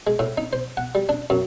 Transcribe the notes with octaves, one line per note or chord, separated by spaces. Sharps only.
G#3
A2
D#4
C5
F#5
G3
D4
F#2